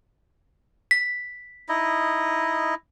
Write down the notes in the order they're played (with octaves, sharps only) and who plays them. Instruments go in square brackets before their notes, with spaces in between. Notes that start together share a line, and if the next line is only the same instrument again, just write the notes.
[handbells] B6
[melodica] D#4 E4 D#5